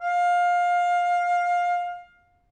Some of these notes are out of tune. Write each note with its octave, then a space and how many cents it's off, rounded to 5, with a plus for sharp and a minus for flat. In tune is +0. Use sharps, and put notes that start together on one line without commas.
F5 +20